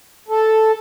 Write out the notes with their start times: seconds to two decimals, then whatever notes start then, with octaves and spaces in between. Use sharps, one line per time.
0.29 A4